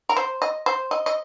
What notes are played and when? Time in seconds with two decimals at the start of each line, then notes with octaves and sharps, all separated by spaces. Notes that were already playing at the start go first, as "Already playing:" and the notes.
0.09 A#4
0.17 C5
0.42 D#5
0.66 C5
0.91 D#5
1.06 D#5